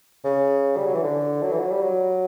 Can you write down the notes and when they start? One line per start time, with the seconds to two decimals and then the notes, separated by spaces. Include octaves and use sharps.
0.25 C#3
0.77 G3
0.86 F#3
0.94 E3
1.04 D3
1.42 F#3
1.51 E3
1.59 F#3
1.71 G3
1.82 F#3